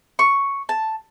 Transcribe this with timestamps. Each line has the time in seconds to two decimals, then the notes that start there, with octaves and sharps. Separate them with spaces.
0.19 C#6
0.69 A5